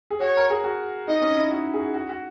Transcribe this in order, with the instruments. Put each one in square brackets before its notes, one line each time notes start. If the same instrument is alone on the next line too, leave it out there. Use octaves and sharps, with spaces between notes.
[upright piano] G#4
[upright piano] F#4 [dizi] C#5
[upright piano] A#4
G#4
F#4
[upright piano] D#4 [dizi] D#5
[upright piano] C#4
E4
F#4
G#4
F#4
F#4
F#4